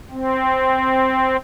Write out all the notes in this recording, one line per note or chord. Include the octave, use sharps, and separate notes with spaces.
C4